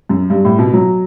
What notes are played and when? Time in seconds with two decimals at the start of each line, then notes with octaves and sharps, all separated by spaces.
0.09 F#2
0.30 G2
0.45 A2
0.59 B2
0.73 F#3